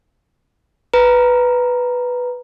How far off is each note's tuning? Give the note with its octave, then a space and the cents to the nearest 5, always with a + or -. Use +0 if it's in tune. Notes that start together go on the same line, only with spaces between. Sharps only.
B4 +0 A#5 +5